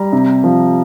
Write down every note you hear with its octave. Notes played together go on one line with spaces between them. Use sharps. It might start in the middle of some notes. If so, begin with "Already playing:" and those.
Already playing: G3 A#5
C3
F3